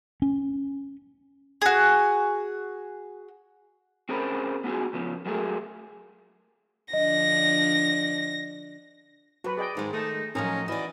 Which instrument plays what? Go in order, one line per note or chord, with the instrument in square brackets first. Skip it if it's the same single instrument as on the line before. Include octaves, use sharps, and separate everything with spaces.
[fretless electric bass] C#4
[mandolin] F#4 G#4
[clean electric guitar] C4 C#4 G#4 A#4 C5 B5
B3 D#4 F#4 G#4
C#3 F3 B3
F#3 G#3 A3 G#4 A#4
[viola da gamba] D3 F3 D4 [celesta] D#5 [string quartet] A#6
[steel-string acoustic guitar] F#3 [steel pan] F#4 B4
[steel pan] G#4 D#5 G5 [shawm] D5
[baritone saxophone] G#2 [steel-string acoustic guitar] D#3 G#3
[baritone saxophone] A3 [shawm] D#4 [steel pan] A5 D#6
[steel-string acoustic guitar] A2 F3 F#3 [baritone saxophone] C#4 [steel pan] D#4 A#4 A#5 [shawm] D#5
[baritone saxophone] E3 [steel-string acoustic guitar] F#4 D5 [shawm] D#5